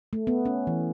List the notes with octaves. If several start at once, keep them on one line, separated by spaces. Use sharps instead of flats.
A3
B3
C#4
E3